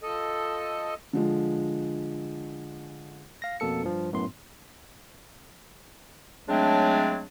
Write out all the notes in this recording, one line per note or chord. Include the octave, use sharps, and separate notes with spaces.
F3 A4 D#5
D3 F3 G#3
F5 A#6
F2 B2 A#3 A4 C#7
G2 F3
F#2 A2 B3 C6
C#3 F#3 G#3 A3 C4 D4